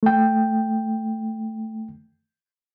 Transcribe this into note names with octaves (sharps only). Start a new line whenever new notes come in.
A3 G5